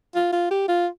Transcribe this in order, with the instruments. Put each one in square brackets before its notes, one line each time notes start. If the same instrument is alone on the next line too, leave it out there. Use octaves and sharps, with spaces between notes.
[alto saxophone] F4
F4
G4
F4